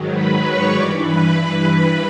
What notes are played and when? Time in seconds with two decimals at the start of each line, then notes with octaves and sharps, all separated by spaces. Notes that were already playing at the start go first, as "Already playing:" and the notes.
Already playing: G#2 D#3 F#3
0.13 B4 B5
0.43 C#5 C#6
0.73 G2 E3 D5 D6
1.03 B4 B5